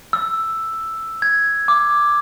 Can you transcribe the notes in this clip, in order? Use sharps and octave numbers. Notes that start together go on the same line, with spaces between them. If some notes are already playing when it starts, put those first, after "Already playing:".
E6
G#6
D6